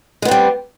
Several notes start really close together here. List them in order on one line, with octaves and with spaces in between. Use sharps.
G#3 B3 C4 G3